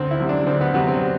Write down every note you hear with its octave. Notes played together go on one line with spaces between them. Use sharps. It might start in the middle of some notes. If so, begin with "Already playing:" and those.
Already playing: D2 C4
E4
C3 F#3
D4
D2 C4
B3
C3 F#3 B3
C4